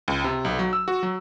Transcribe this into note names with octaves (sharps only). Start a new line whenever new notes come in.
C#2
C3
B1
F#3
E6
F#4
F#3